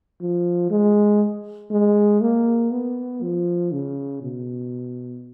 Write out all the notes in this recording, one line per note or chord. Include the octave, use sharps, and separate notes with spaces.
F3
G#3
G#3
A#3
B3
F3
C#3
B2